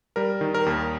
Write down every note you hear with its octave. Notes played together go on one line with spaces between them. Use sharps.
G3 A#4
D#3
A#4
D#2